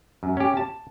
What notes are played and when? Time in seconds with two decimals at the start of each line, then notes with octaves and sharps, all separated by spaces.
0.23 F#2
0.37 C#4 G4
0.57 A5